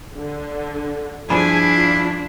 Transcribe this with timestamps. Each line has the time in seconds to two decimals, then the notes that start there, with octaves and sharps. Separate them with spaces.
0.16 D3
1.29 G2 F3 D4 E4 G#4 G#5 B5
1.73 F4